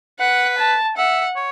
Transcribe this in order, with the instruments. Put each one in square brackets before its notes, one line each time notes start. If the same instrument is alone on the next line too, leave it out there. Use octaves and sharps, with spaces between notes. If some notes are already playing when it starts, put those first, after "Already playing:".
[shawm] B4 [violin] F#5
[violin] A5
[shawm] E5 [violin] F#5
[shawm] C#5